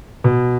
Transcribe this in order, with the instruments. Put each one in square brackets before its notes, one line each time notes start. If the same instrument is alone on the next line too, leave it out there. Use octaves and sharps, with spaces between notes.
[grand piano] B2